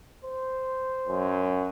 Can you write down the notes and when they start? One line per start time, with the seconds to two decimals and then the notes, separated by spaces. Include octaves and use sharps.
0.24 C5
1.09 F#2